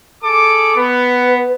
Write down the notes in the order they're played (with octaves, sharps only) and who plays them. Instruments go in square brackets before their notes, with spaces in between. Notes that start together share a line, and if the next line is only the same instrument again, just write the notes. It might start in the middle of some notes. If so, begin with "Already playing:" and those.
[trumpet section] G#4 A4 D6
[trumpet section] B3 [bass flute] B4